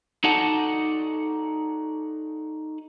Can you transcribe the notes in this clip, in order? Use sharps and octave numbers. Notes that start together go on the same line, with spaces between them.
D#4 F#4 A4 D5 F#5 A5